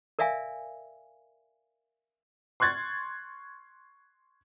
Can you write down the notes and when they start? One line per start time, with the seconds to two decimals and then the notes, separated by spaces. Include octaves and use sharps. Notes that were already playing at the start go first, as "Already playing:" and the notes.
0.19 A#4 D5 E5 F5 G#5
2.60 C6 C#6 F#6 G#6 A6